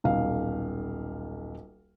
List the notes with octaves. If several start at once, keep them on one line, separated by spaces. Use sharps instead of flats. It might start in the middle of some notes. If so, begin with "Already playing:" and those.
D#1 B1 F5